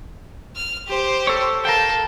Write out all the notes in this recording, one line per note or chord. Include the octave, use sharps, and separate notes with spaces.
F6
G4 C5
A4 C#5
A4 A#4 F5 G5